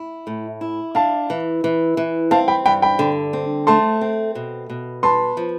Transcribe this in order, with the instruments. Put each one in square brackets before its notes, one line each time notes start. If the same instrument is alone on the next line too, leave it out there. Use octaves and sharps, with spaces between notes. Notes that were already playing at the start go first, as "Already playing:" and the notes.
Already playing: [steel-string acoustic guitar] E4
A2
E4
[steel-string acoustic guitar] D4 [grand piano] F5 A5
[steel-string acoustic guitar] E3
E3
E3
[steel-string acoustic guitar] C4 [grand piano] F5 A5
[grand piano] G5 B5
[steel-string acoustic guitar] G2 [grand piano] G5 B5
[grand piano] G5 B5
[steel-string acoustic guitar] D3
C4
[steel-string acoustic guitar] A3 [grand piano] A5 C6
[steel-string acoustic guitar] C4
B2
B2
[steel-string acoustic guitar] B4 [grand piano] A5 C6
[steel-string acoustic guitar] F3